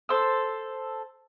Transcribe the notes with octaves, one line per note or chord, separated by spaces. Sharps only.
A4 C5 E6